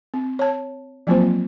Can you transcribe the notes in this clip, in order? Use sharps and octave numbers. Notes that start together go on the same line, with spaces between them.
C4
C#5 A5
F3 F#3 A#3 C4 F4 C5